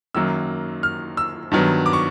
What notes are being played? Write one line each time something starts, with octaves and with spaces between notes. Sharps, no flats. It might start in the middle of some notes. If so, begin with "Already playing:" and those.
F#2 D#3 F#3 A#3 E6
F6
E6
G2 D#3 F#3 B3
D6
C#6